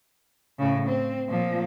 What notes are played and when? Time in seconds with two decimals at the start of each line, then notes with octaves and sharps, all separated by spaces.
0.58 A2 C#3
0.88 C4
1.28 A#2 F3